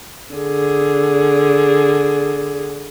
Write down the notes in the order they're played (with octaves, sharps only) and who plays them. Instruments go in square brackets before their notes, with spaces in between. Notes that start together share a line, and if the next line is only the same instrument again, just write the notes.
[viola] D3 G#4